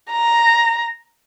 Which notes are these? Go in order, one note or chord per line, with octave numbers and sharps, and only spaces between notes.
A#5